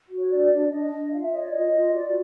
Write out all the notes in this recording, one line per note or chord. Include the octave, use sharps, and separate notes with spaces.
F#4
C#5
D4 D5
D4 D5
D4 D#5
D4
F4 F5
E5
C#5 D#5
D5
F4 D#5
F4
C#5
F#4 D5